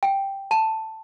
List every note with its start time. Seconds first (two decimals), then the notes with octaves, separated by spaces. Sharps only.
0.03 G5
0.51 A5